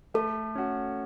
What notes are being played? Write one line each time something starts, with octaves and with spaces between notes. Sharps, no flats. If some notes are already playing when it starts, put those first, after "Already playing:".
A3 A4
C#4 F#4